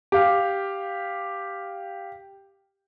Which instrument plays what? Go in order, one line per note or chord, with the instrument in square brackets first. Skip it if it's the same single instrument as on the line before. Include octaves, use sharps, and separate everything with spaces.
[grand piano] G4 F5